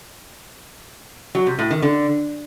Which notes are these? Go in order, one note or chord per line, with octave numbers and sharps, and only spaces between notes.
F#3
C3
A2
D#3
D3